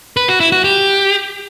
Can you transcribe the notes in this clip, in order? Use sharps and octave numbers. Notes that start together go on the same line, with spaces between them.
B4
F#4
E4
F#4
G4